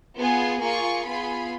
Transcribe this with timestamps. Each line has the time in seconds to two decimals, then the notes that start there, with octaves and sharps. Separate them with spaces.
0.16 B3 F4 G#4
0.61 A#3 F4 G#4 C#6
1.07 B3 F4 G#4 B5